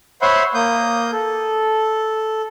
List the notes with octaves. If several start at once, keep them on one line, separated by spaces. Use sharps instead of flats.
C5 C#5 E5 F#5 B5 C6
A#3 D#6 G6
A4